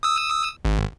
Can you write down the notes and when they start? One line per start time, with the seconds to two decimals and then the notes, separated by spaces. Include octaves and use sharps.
0.03 D#6 E6
0.65 G#1